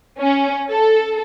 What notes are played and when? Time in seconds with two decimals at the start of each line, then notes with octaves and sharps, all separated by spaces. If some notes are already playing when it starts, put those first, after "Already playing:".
0.20 C#4
0.70 A4